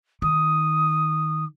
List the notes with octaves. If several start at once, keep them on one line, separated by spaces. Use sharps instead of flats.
D#3 D#6